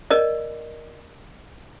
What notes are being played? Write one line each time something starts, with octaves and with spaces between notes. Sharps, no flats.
A#4 D5 D#5